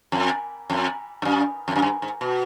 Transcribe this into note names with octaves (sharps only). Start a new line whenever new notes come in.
F2
F2
G2
F#2
F2
F#2
G2
G#2
B2